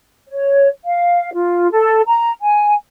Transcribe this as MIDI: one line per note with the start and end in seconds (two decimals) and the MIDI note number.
0.29 0.69 73
0.84 1.30 77
1.34 1.71 65
1.72 2.02 69
2.06 2.31 82
2.41 2.75 80